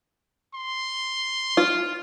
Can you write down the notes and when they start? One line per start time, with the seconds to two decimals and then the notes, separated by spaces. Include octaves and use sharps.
0.54 C6
1.57 F4